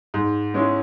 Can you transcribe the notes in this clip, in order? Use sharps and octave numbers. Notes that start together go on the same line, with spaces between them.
G#2
G#3 C#4 E4